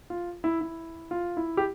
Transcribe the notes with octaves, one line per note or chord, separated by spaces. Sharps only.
F4
E4
E4
F4
E4
G4